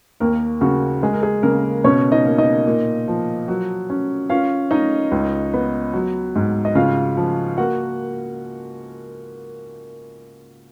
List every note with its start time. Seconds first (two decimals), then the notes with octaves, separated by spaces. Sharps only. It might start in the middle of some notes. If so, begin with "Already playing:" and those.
0.20 D#2 A#3 A#4
0.61 C#3 F#4
1.03 G#3 G#4
1.13 A#4
1.23 G#4
1.43 C#3 A#3 A#4
1.84 B2 C#4 C#5
2.12 D#4 D#5
2.25 A#3
2.38 D#4 D#5
2.67 A#2
3.08 F3
3.48 F#3
3.90 C#4
4.30 C#4 F4 F5
4.71 C#4 D#4 D#5
5.11 C#2
5.54 B3
5.94 F#3
6.36 G#2
6.65 D#5
6.75 C#3 F4 F5
7.17 F3
7.58 A#3 F#4 F#5